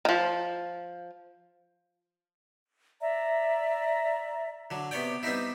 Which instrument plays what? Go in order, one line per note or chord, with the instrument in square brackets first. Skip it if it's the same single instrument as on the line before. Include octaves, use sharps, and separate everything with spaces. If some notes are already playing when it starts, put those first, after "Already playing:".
[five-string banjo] D#3 F3
[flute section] D5 E5 A#5
[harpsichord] D3 F#3
C3 B3 C#5 D5 G5
G3 B3 C4 D#4 E4